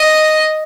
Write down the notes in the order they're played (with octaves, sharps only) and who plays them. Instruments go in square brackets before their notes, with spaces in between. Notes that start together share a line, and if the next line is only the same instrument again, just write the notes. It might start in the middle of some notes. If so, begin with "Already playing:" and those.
Already playing: [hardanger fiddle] D#5